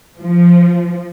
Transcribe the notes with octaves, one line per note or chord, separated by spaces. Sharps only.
F3